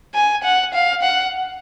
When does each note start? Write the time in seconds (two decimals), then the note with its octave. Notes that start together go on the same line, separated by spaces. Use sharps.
0.14 G#5
0.43 F#5
0.73 F5
1.02 F#5